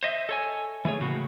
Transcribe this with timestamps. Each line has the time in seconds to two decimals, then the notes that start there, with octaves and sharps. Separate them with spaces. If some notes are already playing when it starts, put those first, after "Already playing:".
0.03 C5 D#5 E5
0.29 A4 C#5 G#5
0.85 E3 A3 G#4 C#5
1.00 A2 C#3 A#3 F#4